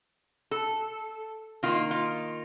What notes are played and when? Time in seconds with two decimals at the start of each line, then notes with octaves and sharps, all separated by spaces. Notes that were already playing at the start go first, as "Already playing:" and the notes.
0.51 A4
1.63 D#3 A#3 D#4 F4
1.91 F4